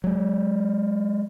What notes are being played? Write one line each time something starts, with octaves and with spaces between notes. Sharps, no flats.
F#3 G#3